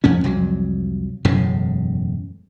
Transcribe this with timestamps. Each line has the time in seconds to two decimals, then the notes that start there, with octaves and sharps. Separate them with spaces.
0.04 F2 F3 C#4
0.24 C2 F2 F#3
1.25 E1 F#2 A2 C#3